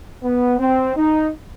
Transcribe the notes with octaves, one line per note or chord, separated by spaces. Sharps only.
B3
C4
D#4